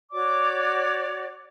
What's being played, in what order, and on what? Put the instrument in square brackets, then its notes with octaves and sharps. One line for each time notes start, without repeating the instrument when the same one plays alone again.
[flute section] F#4 C#5 D5 D6